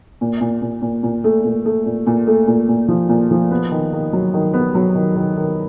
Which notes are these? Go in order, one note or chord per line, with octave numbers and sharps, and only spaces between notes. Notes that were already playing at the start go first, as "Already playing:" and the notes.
A#2
A#2
A#2
A#2
A#2
A3
A#2
A3
A#2
A#2
A3
A#2
A#2
F3
A#2
F3
B3
D#3
D#3
F#3
D#3
B3
F#3
D#3
D#3
D#3